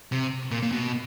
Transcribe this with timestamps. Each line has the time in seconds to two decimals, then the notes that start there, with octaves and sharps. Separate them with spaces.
0.12 C3
0.51 A#2
0.62 A#2
0.72 B2